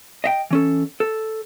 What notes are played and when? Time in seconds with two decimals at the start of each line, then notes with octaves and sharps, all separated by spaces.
0.24 D#5 E5 G5
0.51 E3 C#4 A4
1.00 A4